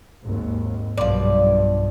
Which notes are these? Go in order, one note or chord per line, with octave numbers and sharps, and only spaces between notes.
G#1 D#2
B1 G2 F3 D5